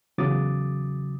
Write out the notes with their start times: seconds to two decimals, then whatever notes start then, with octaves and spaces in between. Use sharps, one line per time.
0.18 E2 C#3 F#3 D6 D#6 A6